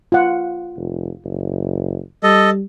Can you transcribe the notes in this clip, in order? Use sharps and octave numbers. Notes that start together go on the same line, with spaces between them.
F4 F#5
F1
F#1
G3 A4 D#5